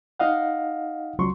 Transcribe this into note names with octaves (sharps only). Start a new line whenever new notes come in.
D#4 D#5 F5 F#5
C#2 F#3 C6 C#6